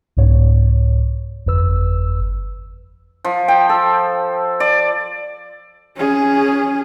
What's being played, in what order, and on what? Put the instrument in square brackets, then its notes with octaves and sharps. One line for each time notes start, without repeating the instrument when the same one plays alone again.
[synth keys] C2 G#2 C#5
G1 F2 B4 E6
[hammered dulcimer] F3
G5
A4
D5
[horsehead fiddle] C#4 G#4